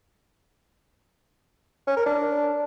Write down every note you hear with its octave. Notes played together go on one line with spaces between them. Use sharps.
C#4
A#4
D4